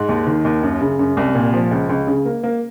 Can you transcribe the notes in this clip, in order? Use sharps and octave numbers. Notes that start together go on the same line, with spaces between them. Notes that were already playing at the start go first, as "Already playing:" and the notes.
Already playing: G#2
D#2
D#3
D#2
F#2
C#3
F#2
C2
A#2
F3
C#2
C#2
C#3
A#3
A#3